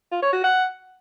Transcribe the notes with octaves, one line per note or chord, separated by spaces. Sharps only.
F4
C#5
F#4
F#5